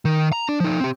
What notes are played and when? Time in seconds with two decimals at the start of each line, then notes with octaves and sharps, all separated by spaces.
0.05 D#3
0.32 A#5
0.49 D4
0.60 F3 D#4
0.80 C4 G4